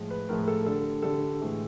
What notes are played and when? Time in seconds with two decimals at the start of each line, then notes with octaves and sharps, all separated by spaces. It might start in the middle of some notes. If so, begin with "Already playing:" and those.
Already playing: A2 F3 G#3
0.10 B4
0.29 A2 F3 G#3 A#4
0.48 A4
0.66 D3 G3 A4
1.02 D3 G3 A4
1.40 A2 E3 G#3